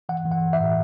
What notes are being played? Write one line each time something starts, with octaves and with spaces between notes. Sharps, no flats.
E3 F#5
E3
F#5
E3
E5
A2